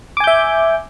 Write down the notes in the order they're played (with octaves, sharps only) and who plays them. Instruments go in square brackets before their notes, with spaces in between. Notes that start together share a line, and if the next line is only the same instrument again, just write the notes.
[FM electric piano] D6
G#5
G6
E5